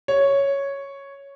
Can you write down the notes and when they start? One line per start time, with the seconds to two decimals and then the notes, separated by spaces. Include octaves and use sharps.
0.08 C#5